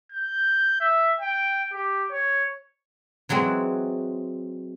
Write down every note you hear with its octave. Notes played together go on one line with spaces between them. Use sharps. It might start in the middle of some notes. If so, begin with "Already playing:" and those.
G6
E5
G5
G4
C#5
E3 F#3 G#3 C4